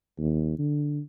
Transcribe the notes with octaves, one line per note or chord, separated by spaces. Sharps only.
D#2
D3